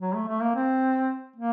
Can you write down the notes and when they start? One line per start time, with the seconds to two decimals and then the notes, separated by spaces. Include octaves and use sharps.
0.01 F#3
0.15 A3
0.28 A3
0.42 A#3
0.55 C4
1.36 A#3